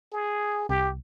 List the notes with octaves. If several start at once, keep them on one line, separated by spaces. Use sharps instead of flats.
G#4
C2 G4